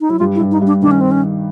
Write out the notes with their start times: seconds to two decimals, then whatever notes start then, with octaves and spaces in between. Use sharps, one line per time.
0.01 D#4
0.09 F#3 E4
0.19 G2 G3 F4
0.35 E4
0.40 G2 G3
0.51 D#4
0.61 G2 G3
0.67 D4
0.82 D#3 D4
0.91 C#4
1.01 C4
1.11 C#4